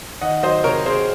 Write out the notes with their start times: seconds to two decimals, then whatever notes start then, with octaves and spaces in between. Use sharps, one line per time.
0.21 D#3 D#5 F#5
0.43 F#3 C5 D#5
0.64 C3 A#4 C#5
0.86 C4 G#4 C5